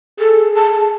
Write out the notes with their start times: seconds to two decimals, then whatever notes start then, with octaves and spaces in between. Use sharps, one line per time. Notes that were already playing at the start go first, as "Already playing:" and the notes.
0.19 G#4 A4
0.55 A5